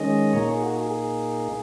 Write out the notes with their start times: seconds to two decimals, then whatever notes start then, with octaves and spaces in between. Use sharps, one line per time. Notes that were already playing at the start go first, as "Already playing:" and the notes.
Already playing: D#3 G#3 C#4 D#5
0.33 A#2 A#3 D#4 C#5
0.47 G#4
0.62 F#4
0.76 G#4
0.91 G#4